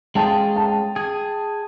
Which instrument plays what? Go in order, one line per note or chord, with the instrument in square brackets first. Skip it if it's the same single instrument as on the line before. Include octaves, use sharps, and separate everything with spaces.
[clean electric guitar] G#3 C#4 F4 G#4 [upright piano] G5 A5
[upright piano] G5 A5
[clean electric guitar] G#4